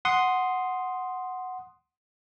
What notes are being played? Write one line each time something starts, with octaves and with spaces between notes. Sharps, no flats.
F#5 C6 D#6